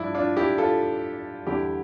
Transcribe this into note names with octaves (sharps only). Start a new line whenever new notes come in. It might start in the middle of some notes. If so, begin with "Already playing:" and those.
Already playing: G2 F3 D4 E4
D4 F4
E4 G4
F4 A4
E2 D3 G3 E4 G4